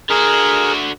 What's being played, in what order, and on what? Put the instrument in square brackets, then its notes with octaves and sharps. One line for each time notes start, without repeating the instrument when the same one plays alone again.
[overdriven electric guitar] D3 F#4 [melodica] G#4 A#4